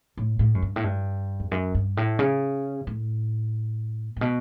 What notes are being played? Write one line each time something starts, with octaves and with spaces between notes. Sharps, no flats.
A2
A2
F#2
G2
A2
G2
E2
F#2
G2
A2
C#3
A2
A2
B2